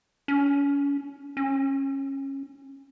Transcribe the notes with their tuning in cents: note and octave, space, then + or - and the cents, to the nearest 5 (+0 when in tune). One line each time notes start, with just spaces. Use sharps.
C#4 +35
C#4 -20